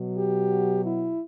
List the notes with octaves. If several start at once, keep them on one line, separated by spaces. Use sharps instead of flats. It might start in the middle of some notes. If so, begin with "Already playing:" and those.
Already playing: B2 F#3
G4
E4